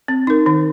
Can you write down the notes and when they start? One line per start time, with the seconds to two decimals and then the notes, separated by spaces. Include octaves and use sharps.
0.08 C4
0.27 D#4 A#4
0.46 D#3